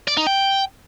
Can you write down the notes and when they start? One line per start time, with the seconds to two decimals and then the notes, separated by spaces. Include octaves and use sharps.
0.08 D5
0.17 D#4
0.27 G5